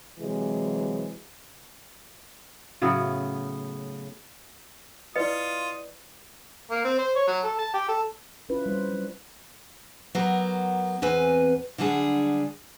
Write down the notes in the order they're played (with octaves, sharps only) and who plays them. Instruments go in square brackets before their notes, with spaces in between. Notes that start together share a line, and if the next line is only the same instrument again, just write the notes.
[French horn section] C3 E3 F#3 G#3
[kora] A2 C#3 F#3 B3
[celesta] E4 D5 C#7 [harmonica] F4 [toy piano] B4 D#5 [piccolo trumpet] D#6
[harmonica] A#3
C4
C5
C#5
F#3
A4
A5
G4
A4
[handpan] C#4 E4 F4 B4
G3 C5
F#3
[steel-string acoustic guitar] F#3 B3 G4 A#4
E2 C4 B4 G#5
D3 F#3 G3 D4 F4 G#4